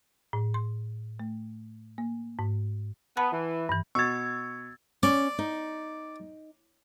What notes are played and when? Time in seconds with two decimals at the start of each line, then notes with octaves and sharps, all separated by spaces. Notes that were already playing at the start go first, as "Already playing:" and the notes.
0.33 A2
0.54 C6
1.20 A3
1.98 A#3
2.39 G#2
3.17 B3 F#5 A5 B5
3.32 E3
3.69 G2 E3
3.95 B2 C#6 E6 G#6 A6
5.03 C#4 D5
5.39 D#4